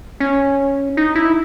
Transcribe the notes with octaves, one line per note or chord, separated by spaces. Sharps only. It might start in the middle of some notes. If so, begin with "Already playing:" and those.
C#4
D#4
E4